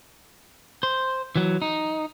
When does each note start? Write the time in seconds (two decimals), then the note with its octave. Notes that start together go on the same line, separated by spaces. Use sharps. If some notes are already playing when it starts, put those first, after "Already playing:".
0.83 C5
1.36 E3 F#3
1.62 D#4